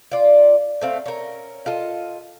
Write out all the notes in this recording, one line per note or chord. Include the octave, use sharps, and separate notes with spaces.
F4 D5
A3 C4 F5
C#4 A#4
F4 A4 D#5